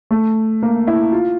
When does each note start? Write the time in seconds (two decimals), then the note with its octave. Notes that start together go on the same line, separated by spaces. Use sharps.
0.11 A3
0.63 A#3
0.87 E4
1.13 F4